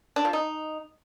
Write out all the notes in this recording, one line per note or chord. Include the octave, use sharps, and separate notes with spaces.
D4
F3
D#4